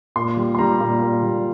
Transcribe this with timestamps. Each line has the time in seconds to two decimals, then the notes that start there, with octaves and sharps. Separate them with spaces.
0.16 A#2 C6
0.37 G3
0.55 C6
0.58 G3 A#5
0.80 A#2
1.01 A#2
1.23 G3